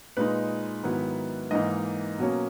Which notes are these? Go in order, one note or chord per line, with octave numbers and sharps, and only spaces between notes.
A#2 G#3 D#4 B4
G#2 D#3 F#3 B3 E4
G#2 E3 A#3 D#4 D#5
B2 F#3 A#3 C#4